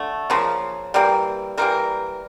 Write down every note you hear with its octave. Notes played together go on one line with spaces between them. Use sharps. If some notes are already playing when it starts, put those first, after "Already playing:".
Already playing: D3 A3
C#3 F3 A#3
E3 G3 A#3
E3 G3 A#3 A#4